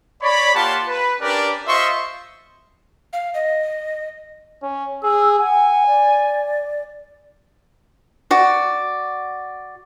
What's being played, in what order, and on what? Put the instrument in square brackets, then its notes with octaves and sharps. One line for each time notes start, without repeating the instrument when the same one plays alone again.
[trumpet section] C#5 D5 B5
A#3 F4 G4 F#5 A5 C6
B4
C#4 D4 G4 A#4 B4 D5
F4 C5 D#5 E5 C6 C#6
[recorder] F5
D#5
[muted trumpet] C#4
[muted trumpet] G#4 [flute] E6
[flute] F#5 [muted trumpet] G#5
[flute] D5
[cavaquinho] F#4 D5